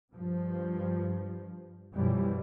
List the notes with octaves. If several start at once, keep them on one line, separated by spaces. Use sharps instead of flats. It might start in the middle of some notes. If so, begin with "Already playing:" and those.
G2 F3
F#2 B2 E3 F3 G3